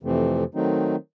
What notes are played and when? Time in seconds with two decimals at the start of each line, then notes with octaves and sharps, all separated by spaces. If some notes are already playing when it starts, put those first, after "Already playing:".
0.03 F2 C3 E3 A3 C4
0.54 D#3 F#3 A3 C4 D#4